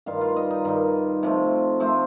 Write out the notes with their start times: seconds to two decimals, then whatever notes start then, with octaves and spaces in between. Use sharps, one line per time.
0.06 G2 D#3 G3 F4 F5
0.21 F4 F5
0.36 D#4 D#5
0.50 D#4 D#5
0.65 G2 D#3 G3 D#4 D#5
1.23 C3 F3 A3
1.80 C3 F3 A3 C4 C5